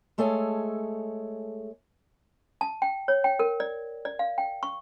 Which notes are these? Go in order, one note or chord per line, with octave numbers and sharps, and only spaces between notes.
G#3 A3 G#4 A4 C#5 G#5
A5
G5
C#5
G5
A#4
D5
D5
F5
G5
C#6